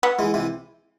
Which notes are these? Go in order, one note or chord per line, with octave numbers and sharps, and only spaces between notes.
B3
E3 G#3
C3 E3